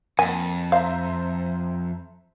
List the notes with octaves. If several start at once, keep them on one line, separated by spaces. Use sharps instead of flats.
F2 A#3 G#5 A5
C5 E5 F5 A#5